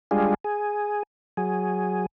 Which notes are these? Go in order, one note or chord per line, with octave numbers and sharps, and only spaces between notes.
G3 G#3 D4 F4 G#4
G#4
F#3 G#4